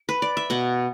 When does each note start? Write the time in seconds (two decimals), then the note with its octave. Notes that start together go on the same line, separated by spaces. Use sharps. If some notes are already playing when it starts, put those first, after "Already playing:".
Already playing: A4
0.09 B4
0.22 D5
0.37 E5
0.50 B2 F#5